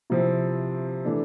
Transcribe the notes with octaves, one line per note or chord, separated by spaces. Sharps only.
C3 F3 C4 E4
E3 A3 D4